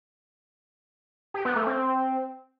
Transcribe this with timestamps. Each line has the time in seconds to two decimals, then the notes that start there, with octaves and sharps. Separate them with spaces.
1.34 G4
1.45 B3
1.56 A3
1.67 C4